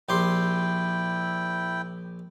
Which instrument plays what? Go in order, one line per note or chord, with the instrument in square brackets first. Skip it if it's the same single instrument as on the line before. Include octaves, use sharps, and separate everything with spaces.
[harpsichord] A#1 G4 C6 [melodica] E4 G5